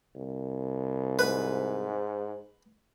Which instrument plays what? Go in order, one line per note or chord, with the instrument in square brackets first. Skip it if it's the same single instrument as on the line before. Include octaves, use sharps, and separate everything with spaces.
[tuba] C2
[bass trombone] G#2 [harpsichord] B4